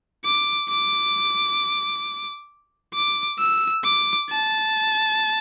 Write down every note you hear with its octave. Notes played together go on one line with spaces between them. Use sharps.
D6
D6
D6
E6
D6
A5